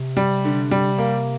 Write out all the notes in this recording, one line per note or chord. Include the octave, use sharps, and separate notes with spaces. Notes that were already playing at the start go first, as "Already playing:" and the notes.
Already playing: C3
G3
D3
G3
A#3